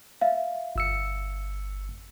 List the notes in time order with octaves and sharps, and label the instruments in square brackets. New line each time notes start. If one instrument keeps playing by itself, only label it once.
[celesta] E5 F5
[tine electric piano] G1 E6 C#7